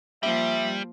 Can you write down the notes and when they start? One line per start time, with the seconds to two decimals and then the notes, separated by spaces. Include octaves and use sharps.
0.23 F3 G3 A#3 E5